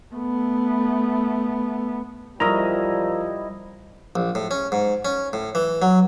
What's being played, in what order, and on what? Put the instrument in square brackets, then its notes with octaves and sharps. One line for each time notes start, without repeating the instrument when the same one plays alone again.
[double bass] A3 B3
[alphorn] F3 [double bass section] G3 [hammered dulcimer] E4 D#5 [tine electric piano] A#4 A#5
[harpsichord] A#1
A2
C#4
G#2
C#4
A2
E3
F#3